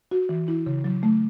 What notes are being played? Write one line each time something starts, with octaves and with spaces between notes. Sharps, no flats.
F#4
E3
E4
C#3
F#3
A3